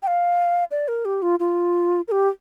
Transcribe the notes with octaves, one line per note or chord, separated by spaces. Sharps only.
G5
F5
D5
A#4
G4
F4
F4
A#4
G4